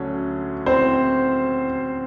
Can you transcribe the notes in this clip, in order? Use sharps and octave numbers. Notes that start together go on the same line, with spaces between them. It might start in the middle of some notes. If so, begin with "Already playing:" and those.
Already playing: D2 D3 F#3 C#4
C4 C5